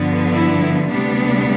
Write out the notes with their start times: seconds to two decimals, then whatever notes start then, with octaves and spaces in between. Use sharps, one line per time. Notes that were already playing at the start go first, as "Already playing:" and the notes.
Already playing: G2 D3 F3 B3
0.33 E4
0.88 D2 C3 G3 B3 D4